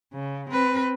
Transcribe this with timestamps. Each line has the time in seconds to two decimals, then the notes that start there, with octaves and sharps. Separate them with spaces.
0.14 C#3
0.50 C4 B4